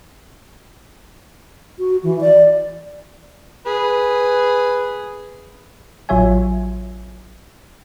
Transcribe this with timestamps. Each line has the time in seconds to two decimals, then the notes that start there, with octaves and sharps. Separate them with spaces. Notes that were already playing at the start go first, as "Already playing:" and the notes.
1.79 F#4
2.03 E3
2.21 D5
3.66 G#4 B4
6.09 A1 F#3 F4 C#5 E5 G#5